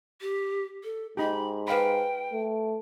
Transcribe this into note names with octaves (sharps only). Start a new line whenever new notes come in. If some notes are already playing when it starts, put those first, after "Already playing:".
G4
A4
G#2 D#4 G4 B5
B4 F5 G5 B5
A3